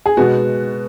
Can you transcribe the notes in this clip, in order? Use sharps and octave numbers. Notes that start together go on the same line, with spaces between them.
G#4
B2 G#3 B3 F#4